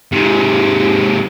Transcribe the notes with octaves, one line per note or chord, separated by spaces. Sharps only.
G#2 C3